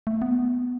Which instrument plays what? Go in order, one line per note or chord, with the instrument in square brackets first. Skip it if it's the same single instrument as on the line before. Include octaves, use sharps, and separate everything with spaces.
[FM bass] A3
B3